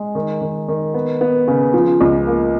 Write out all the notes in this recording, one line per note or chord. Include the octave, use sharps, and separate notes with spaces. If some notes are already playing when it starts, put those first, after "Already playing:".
Already playing: G#3
D#3
D#3
D#3
B3
B3
C#3
F3
C#2
A#3